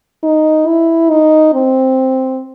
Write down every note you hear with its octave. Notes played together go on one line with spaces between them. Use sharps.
D#4
E4
D#4
C4